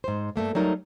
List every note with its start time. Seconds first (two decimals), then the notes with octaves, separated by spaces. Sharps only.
0.04 G#2 C5
0.36 G2 B2 A3 A#3
0.55 F#3 G3 A3 D#4 A#4